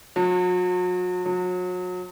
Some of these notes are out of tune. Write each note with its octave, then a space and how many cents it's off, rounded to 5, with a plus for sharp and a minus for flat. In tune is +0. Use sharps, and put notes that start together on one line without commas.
F#3 -40
F#3 -35